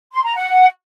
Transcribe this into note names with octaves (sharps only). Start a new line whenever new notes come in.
C6
A#5
F#5